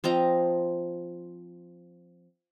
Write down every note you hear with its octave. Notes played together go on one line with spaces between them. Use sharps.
F3 C4 D#5 A#5